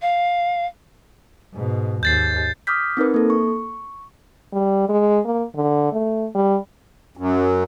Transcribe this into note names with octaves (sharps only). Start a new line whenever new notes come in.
F5
G#2 B2
D#2 G#2 G6 A6 C7
D6 D#6 F6 G6 B6
C4 D#4 A#4 B4
A#3 A4
C#6
G3
G#3
A#3
D3
A3
G3
F#2